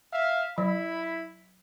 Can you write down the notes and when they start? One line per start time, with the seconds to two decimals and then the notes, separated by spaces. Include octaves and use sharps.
0.13 E5 F5
0.58 F#3 E4 B5